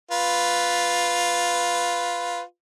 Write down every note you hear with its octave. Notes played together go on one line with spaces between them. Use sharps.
F4 B4